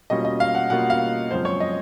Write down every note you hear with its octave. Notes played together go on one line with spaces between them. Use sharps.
B2 G3 A#3 C#4 F4 D#5
D#5
F5
F#5
B2 G3 A#3 C#4 F4 F#5
F5
F#2 C#3 F3 G#3 C4 C5
C#5
D#5